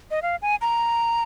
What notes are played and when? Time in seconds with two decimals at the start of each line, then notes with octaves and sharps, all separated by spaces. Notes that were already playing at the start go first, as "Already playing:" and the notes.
0.11 D#5
0.22 F5
0.42 G#5
0.61 A#5